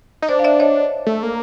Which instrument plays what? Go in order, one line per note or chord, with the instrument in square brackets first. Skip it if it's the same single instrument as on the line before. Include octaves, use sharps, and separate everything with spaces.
[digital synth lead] D#4
[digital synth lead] D4 [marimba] C5 D5
[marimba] F5
D5 E5
C#5 D#5
[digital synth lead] A3
A#3